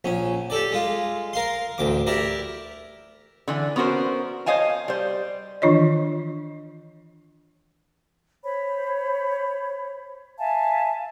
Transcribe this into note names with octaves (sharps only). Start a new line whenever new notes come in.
A#1 C#4
G4 A4 D5
G#3 F4
A#4 F5 C6
A1 D2 D6
E4 G4 A#4 D5
D3 E3 D4
B3 C#4 F#4 A#4 C5
C5 C#5 D#5 F5 G#5 A5
G3 C5
D#3 E3 D4 F4 C#5 D#5
C5 C#5 B5
E5 F5 G#5 A5